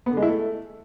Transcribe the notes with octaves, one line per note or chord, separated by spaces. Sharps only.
B3
D3
G#3
E4
A3